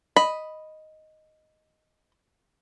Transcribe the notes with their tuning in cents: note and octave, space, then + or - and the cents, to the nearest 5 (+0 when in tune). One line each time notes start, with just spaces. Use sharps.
D#5 +0 B5 +0